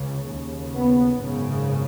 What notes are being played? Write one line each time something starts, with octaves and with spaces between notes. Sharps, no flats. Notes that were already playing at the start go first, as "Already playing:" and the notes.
Already playing: C#2 C#3
D#2 C#3
B3
G#1 F#2 C#3